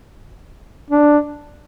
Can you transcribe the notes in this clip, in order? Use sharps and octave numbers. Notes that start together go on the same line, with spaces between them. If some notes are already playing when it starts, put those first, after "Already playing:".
D4